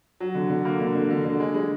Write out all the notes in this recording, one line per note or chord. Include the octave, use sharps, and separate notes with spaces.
F#3
D3
D3
A#3
D3
D3
D3
D3
G#3
G#3